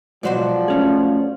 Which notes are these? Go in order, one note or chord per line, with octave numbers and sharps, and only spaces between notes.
G#2 B2 F3 F#3 F#4 C5 D5
A3 C#4 G#4